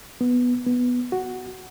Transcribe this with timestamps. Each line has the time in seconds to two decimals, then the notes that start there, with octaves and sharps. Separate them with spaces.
0.21 B3
0.66 B3
1.12 F#4